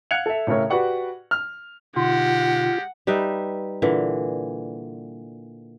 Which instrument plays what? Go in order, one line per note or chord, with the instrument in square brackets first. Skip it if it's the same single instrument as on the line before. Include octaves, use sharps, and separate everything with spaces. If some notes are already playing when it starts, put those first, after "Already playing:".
[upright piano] F5 F#5 F#6 G#6 C#7 F7
A4 E5
A2 C#3 E4 A#4 C#5
F#4 G4 B4 D5 F#5 C#6
F6
[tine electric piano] B2 D3 D#4 [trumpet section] G#3 G4 [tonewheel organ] F4 [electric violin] F#5
[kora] G3 D#4 B4 E5
A#2 D3 E3